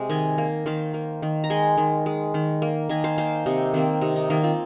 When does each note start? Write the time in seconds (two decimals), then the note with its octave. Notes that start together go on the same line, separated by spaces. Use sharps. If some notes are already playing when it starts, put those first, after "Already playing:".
Already playing: C3 G#3
0.09 D#3 D#5 G#5
0.38 A#3
0.66 D#3 C5 F5
0.94 A#3
1.22 D#3
1.44 A#5
1.50 G#3 G#5 C6
1.78 D#3
2.06 G#3
2.34 D#3
2.62 A#3
2.89 D#3 D#5 G#5
3.04 C5 F5
3.18 A#3 C5 F5
3.46 C3 D#4
3.74 D#3 A#3 C4
4.01 C3 D#4
4.16 D#4
4.30 D#3 A#3 D#4
4.44 C4 F4